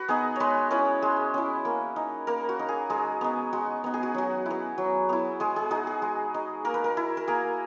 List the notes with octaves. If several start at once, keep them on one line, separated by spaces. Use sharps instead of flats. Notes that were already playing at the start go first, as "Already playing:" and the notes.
Already playing: F#4 B4
B3 D#4 G#4
G#3 B4 C#5
C#4 E4 B4
G#3
C#4 E4
A#3
D#4
A#3 A#4
F#4
D#4
G#4
G#3 G#4
B3 D#4
G#3 F#4
B3 D#4
G#4
F#4
F#3 F#4
B3 E4
F#3
B3 E4
G#3 G#4
G#4
D#4 F#4
G#4
G#3
D#4
A#3 A#4
B4
A#4
E4
A#4
A#3 G#4